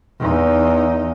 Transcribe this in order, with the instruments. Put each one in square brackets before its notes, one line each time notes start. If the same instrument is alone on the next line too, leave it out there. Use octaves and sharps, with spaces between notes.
[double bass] E2 D#4